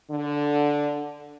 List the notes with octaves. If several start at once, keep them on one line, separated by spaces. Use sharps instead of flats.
D3